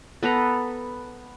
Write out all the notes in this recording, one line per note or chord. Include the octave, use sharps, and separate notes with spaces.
B3 A4 B4 A#5